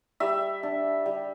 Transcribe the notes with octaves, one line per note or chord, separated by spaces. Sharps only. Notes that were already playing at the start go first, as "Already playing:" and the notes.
G3 E5
D4
G3